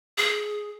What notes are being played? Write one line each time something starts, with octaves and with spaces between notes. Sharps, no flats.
G#4